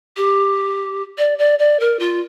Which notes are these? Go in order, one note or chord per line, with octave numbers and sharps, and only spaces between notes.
G4
D5
D5
D5
A#4
F4